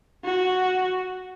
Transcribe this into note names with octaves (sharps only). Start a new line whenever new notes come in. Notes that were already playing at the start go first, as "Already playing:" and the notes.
F#4